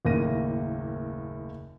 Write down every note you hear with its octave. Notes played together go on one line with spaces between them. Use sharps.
F#1 D#2 A2 A#3 A#6 D#7